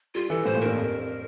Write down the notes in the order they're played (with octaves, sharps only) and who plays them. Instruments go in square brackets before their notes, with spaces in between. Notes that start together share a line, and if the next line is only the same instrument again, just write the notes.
[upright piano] G3 [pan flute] F4
[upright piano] E3 [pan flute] A4
[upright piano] A2 [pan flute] C5
[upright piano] A#2
[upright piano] G2 [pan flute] A#4
[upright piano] F2